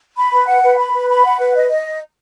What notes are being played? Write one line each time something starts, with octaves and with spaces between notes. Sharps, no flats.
B5
B4
F#5
B4
B5
B4
B5
F#5
B4
D#5
D#5